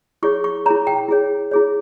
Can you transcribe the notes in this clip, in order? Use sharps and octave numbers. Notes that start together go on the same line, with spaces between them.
E4 G#4 C#5 C#6
C#6
E4 G#4 C#5 A#5
G5
E4 G#4 C#5
E4 G#4 C#5